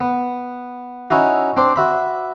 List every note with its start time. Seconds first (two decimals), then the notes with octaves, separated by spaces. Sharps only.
0.01 B3
1.10 C#4 D#4 E4 F#4
1.57 C4 D4 C5
1.76 F#4 E5 B5